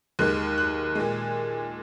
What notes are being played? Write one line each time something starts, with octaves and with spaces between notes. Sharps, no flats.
D#2 D#3 G#3 F#6
F#6
A#2 G#3